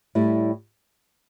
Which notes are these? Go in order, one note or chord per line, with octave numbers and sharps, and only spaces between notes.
A2 G3 E4